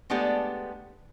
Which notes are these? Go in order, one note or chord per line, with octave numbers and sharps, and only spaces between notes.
G#3 A3 B3 D4 G4